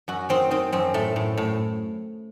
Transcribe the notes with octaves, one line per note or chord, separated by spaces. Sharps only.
F#2 F#4
D#3 C4
D#3 C4
F#2 C4
A2 A3
A2
A2